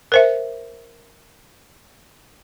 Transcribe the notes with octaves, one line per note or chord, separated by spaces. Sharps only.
A#4 C5 E5